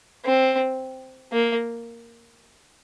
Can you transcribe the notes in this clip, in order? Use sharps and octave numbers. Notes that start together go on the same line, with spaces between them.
C4
A#3